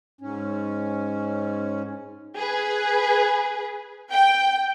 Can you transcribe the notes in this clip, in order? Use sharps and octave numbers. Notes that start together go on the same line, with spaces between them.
G#2 C#4
G#4 B4
G5